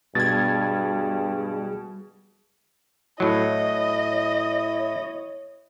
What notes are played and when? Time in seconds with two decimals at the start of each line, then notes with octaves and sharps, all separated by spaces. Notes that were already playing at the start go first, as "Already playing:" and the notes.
0.15 G2 B2 G3 G#4 G#6 A6
3.20 A2 F#3 E4 C#5 D#5